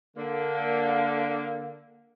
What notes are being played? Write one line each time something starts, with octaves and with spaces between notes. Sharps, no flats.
D3 A#3